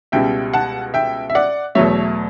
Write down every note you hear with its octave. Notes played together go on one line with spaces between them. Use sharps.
C#2 B2 G3 E5 G5
F#5 A5
E5 G5
E5
D5 F#5
E2 B2 F#3 A3 C#5 E5